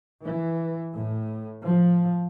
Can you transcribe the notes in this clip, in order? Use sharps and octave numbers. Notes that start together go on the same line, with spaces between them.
E3
A2
F3